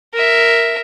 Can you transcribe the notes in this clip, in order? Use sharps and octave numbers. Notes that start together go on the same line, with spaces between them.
A#4 E5